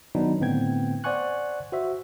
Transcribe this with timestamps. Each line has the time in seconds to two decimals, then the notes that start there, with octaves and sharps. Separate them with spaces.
0.15 D#3 F#3 B3 D4 D#4 B4
0.40 A2 D3 B3 C4 G5 G#6
1.04 C5 D5 F#5 G#5 C#6 F#6
1.72 F#4 C5 E5